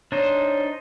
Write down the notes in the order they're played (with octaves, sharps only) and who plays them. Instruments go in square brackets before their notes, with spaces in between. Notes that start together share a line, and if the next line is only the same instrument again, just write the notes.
[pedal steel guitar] D4 D#4 C5 [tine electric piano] C#5